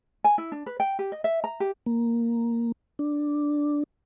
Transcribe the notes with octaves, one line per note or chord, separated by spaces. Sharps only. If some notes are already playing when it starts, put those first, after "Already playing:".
G#5
E4
D4
B4
G5
G4
D#5
E5
A#5
G4
A#3
D4